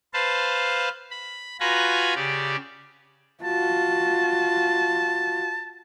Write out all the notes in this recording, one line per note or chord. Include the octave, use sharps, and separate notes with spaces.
B4 C5 F5 A5
B5
F4 F#4 B4 G#5 A#5 B5
C#3 G4 D5
F4 F#4 A5